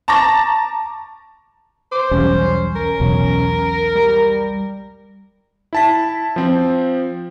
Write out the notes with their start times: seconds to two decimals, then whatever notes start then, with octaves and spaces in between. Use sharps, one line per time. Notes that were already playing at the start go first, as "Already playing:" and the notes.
0.08 A5 A#5 C#6 D6 A6 A#6
1.92 C5 D6
2.11 B1 E2 G3 C#4
2.76 A#4
3.00 B1 E2 B2
3.95 G3
5.73 E4 A5 B6
6.36 F3 C4